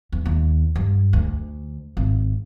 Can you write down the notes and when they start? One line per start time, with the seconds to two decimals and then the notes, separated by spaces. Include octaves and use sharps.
0.12 E2
0.26 D#2
0.75 G2
1.13 D2
1.97 G#1